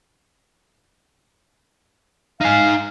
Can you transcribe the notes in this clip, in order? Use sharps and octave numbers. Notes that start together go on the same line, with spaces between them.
D#4 F5 G#5